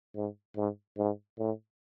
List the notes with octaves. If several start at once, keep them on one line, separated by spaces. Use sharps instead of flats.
G#2
G#2
G#2
A2